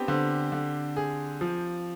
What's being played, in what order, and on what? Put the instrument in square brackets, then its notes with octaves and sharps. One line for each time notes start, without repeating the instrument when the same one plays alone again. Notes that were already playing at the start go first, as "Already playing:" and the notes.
Already playing: [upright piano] B3 [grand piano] C4 D4 G4
[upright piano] D3 [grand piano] C5
[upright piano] D3
G#4
F3